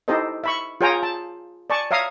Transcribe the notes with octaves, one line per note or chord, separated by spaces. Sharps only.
D#4 E4 G4 A4 C5 D#5
E5 B5 C#6
F4 G#4 C#5 G5 G#5 A#5
A5
D5 G#5 A5 C#6
C#5 E5 F5 A#5 D#6